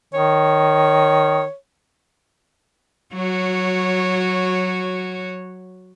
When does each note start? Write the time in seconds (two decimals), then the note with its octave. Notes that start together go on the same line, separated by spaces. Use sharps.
0.14 D#3 C#5
3.13 F#3 F#4 C#5